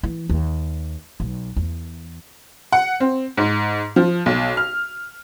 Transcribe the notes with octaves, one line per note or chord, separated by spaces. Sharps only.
E3
D#2
B1
E2
F#5
C4
G#2
F3
B1
F6